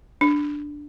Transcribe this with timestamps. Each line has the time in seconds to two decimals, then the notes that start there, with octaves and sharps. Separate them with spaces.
0.21 D4